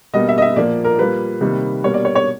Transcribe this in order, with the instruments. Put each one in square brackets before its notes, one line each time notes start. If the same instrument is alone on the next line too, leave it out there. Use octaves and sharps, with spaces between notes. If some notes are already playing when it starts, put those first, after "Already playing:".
[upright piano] B2 G3 A#3 D#5
E5
D#5
E5
A#2 F3 A#3 D5
A#4
A#2 G3 A#3 B4
C3 D#3 G3 A#3
B2 G3 A#3 C#5
D5
C#5
C#5